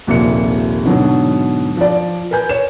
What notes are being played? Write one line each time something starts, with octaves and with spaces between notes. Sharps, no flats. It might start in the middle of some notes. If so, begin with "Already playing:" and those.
D#1 A#1 C3 A#3 C#7
G#2 B2 D3 F#3
F3 D5
A#4 B4 G#5 G6
C#5 E7